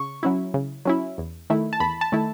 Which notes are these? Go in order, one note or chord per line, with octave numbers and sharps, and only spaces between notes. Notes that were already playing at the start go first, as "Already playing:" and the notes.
Already playing: C#3 C#6
F#3 C#4 E4
C#3
F#3 C#4 E4
E2
D#3 A3 E4
A5
E2 B5
A5
D#3 A3 E4